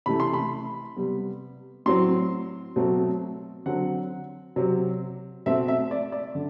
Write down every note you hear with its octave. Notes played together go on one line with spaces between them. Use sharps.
C3 E3 A3 B5
C6
B5
C3 G3 B3
A2 F#3 C4 C6
B2 F#3 A3 C4
D3 F#3 C4 F#5
C3 F#3 C4
B2 A3 C4 E5
E5
D5
D5
D3